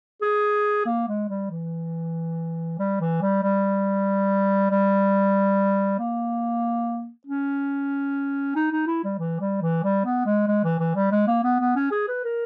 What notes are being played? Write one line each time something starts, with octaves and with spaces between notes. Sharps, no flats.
G#4
A#3
G#3
G3
E3
G3
E3
G3
G3
G3
A#3
C#4
D#4
D#4
E4
G3
E3
G3
E3
G3
B3
G#3
G#3
E3
E3
G3
G#3
A#3
B3
B3
C#4
G#4
B4
A#4